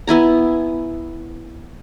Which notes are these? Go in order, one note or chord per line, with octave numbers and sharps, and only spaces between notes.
B3 E4 G#5 A#5